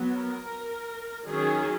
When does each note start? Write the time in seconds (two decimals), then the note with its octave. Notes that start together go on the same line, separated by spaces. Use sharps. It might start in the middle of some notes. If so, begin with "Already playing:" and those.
Already playing: F#3 B3
0.13 A#4
1.26 D#3 F#3 C#4 G#4